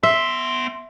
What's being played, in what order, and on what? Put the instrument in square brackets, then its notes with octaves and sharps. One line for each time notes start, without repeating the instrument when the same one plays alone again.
[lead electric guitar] B3 C6 [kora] E5